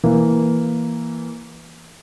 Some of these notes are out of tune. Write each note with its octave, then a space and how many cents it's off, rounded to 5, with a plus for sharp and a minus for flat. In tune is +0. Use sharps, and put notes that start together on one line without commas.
E3 +0 A#3 +0